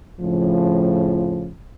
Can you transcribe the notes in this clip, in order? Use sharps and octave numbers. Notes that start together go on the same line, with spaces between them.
F2 A2 C#3 F3